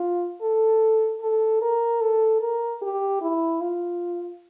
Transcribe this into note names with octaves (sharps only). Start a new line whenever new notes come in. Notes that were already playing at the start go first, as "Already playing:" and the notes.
Already playing: F4
A4
A4
A#4
A4
A#4
G4
E4
F4